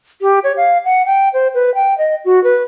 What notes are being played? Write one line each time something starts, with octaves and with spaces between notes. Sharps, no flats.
G4
C#5
F5
F#5
G5
C5
B4
G5
D#5
F#4
B4